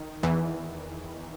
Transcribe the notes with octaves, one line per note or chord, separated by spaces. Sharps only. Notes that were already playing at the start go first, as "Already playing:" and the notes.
Already playing: D#3
E2 E3